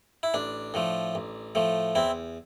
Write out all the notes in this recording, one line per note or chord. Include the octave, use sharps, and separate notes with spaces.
E4
A1 D4
A2 F3 A3
A1
A2 F3 A3
E2 C4 E4